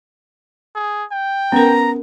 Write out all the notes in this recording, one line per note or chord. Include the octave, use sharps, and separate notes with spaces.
G#4
G5
B3 C#4 A#4 A#5